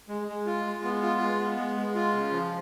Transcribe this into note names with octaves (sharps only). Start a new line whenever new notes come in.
G#3
G#3
F4
G#3
B3
F4
G#3
B3
G#3
G#3
F4
C#3
F3